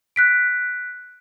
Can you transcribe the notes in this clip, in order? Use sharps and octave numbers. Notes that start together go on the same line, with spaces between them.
F#6 B6 D7